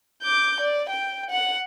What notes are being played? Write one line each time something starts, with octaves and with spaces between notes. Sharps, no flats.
D6 G6
D5
G5
F#5